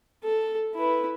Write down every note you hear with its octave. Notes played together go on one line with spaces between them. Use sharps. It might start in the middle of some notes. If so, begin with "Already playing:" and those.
A4
E4 B4